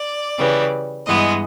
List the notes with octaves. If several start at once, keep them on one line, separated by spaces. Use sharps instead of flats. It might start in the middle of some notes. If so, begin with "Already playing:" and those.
Already playing: D5
C#3 E3 G3
G2 E3 G#3 B3 D#5